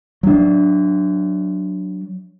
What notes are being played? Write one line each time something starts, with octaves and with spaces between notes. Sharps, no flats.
F#3 D4